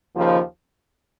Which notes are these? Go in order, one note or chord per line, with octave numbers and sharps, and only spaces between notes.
D#2 C#3 F3